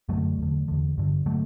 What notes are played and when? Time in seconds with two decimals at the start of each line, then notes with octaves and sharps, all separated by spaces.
0.09 F#2 D3 F#3 A3
0.38 E2 D3
0.68 E2 D3
0.98 G2 D3
1.26 D3 F#3 A3